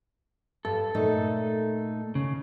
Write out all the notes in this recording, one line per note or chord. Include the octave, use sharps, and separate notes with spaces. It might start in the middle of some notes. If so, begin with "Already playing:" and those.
G2 A4
A#2 A3 D#4
C#3